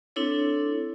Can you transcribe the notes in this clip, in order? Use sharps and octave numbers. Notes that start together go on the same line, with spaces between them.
C4 D4 E4 A4 C#5